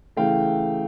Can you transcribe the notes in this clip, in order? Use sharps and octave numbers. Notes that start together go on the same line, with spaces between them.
C#3 E3 A3 F5 G5